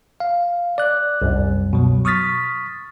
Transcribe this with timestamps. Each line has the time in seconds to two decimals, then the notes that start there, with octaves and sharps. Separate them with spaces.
0.20 F5
0.78 D5 F#6
1.22 C2 F#2
1.73 B2 F#3
2.05 C#6 D#6 F6 A6 B6